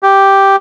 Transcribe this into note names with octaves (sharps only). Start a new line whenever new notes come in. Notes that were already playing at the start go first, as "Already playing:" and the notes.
G4